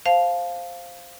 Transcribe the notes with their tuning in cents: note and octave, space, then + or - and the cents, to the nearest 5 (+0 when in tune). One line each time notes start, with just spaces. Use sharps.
C5 +0 F5 +0 A5 -15